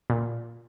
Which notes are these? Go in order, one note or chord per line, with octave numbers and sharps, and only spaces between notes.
A#2